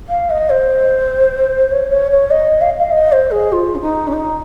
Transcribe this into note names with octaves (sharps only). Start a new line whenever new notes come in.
F5
D#5
C5
C#5
C#5
C#5
D#5
F5
F5
D#5
C5
G#4
F4
C#4
D#4
C#4
D#4